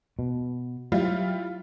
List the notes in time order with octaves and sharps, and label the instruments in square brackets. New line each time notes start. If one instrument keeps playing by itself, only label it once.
[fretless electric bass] B2
[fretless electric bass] F#3 [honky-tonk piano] G3 E4 F4